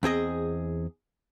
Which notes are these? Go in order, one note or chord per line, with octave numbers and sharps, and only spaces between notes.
E2 C4 G#4 D#5